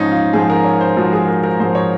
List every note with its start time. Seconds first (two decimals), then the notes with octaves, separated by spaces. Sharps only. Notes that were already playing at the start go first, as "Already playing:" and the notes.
Already playing: G#2 F3 C#4 D#4
0.12 F4
0.33 G#2 F3 G#4
0.50 A#4
0.64 C#5
0.81 C5
0.96 G#2 F3 F#4
1.13 G#4
1.28 A#4
1.44 A#4
1.60 G#2 F3 C5
1.75 C#5